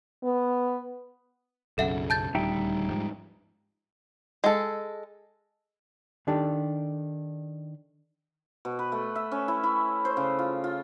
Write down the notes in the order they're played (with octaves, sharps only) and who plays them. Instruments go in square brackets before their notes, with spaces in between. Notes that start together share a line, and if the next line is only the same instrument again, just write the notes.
[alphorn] B3
[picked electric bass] B1 F#2 C#3 [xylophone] A4 E5 F#5
[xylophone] A5 G6 A6
[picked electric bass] D#1 D2 G3 [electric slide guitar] D#4 E5 G5
[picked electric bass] G#2 F3 G3
[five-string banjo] G#3 A4
[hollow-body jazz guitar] D#3 D4 G4 A4
[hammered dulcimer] B2
B4
A3
E5
C#4
E4
E4
C5
C#3
F4
F4